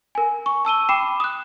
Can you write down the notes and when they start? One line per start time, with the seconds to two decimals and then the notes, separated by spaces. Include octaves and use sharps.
0.15 A#4 G#5
0.46 C#6
0.65 A5 E6 D#7 G7
0.89 G5 B5 D6 C7 E7
1.20 D#6 F#6